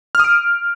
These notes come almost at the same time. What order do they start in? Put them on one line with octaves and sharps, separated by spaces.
F6 D#6 D7